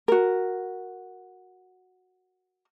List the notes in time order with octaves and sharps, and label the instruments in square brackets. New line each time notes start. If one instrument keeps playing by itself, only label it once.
[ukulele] F#4 A#4